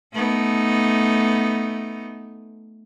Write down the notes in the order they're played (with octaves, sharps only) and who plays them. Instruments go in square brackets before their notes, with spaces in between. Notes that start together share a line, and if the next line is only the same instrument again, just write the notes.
[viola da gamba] A3 B3 D#4